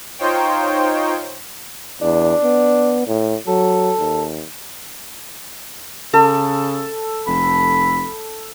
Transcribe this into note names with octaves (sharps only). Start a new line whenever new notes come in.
D#4 F4 C5 C#5 G5
E2 D4
B3
A2
F#3 A4
D#2
C#3 A4
F1 B5